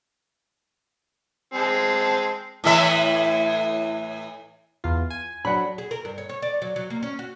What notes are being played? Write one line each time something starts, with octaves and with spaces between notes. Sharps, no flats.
G#3 C4 A5
A2 E3 E5
E2 F4
G#5
F#3 D4 F#5 B5
G#4
A#4
G2
C#5
C#5
D5
F#3
F#3
A#3
C#4
F#4